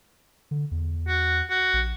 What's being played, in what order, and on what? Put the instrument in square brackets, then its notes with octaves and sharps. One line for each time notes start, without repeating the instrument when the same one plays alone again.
[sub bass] D3
E2
[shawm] F#4
F#4
[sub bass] A#1